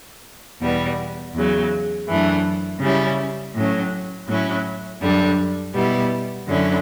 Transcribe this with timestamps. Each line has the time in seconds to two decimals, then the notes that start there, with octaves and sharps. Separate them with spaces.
0.61 E2 B2 G3 B3
1.35 E2 C#3 F#3
2.08 F#2 E3 A3 D4
2.81 C#3 G3 C#4 E4
3.54 A2 F#3 C#4
4.28 A2 F#3 C#4 E4
5.01 F#2 D3 G3 D4
5.74 B2 G3 B3 E4
6.48 F#2 D3 F#3 C#4 E4